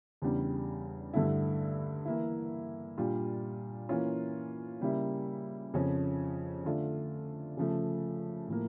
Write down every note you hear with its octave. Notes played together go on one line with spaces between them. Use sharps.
E2 C#3 G3 D4
G2 D3 A3 E4
E3 A#3 E4
A#2 G3 D4 F4
E3 A#3 C#4 F4
C#3 G3 A#3 E4
F2 C#3 F3 C#4
D3 A3 D4 F4
C#3 F3 A3
A2 F3 A#3